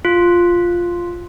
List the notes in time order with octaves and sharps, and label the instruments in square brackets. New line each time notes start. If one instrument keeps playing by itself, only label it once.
[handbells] F4